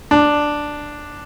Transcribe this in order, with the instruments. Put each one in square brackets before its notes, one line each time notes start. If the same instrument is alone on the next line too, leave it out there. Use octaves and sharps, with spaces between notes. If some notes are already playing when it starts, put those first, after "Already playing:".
[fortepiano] D4